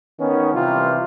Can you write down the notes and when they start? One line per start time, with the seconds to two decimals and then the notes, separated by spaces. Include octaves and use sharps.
0.20 D#3 B3 C#4
0.52 C3 E3 G3 F4